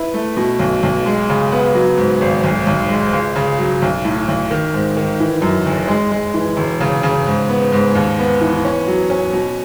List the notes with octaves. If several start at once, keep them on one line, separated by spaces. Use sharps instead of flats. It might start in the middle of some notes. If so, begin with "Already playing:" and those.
Already playing: E4 B4
A3
B2
B1
B1
G#3
C#3
B3
F#3
G#2
G#1
B1
B1
G#3
C#2
C#3
F#3
B1
A2
B1
D#3
G#2
D#3
E3
F#2
F#1
G#3
G#3
E3
E1
C#3
C#3
G#2
B3
G#2
D#2
B3
E3
C#4
F#3
C#4
B2